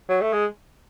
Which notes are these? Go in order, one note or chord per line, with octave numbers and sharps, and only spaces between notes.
F#3
A3
G#3